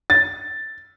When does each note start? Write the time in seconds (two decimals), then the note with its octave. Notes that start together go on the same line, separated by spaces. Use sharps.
0.10 A6